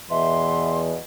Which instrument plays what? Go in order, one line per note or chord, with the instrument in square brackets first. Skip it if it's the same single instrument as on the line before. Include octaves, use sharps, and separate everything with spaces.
[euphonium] E2 [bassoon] B2 [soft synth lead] E5 [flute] C6